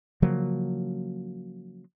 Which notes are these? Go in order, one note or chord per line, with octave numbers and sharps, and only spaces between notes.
C#3 F3 F#3 A#3